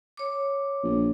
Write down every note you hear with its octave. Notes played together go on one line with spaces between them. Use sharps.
C#5 D6
A#1